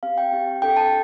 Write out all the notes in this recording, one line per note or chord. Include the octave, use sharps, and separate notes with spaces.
C4 G4 F5
G5
C4 G4
D4 A4 G5
A5